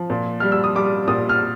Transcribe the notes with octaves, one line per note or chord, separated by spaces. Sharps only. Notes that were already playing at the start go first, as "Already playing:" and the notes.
Already playing: F3
A#2
G3 F6
E6
D#6
G3 D6
A#2 D#6
F6